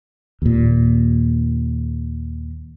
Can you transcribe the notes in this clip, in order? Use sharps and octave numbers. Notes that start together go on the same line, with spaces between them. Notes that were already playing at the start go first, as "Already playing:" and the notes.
D#2 A#2